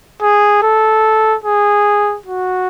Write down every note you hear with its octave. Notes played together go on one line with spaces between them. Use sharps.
G#4
A4
G#4
F#4